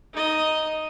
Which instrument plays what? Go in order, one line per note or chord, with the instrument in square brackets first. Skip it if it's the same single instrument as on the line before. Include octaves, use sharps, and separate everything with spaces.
[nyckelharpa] D#4 D#5